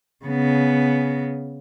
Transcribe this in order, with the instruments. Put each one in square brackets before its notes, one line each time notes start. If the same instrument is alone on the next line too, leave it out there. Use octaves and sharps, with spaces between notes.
[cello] C#3 B3